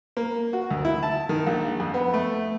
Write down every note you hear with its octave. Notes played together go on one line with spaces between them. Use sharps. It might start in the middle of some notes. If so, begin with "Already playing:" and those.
A#3
F#4
D2
E4
A5
D#3
A#1
F2
B3
A3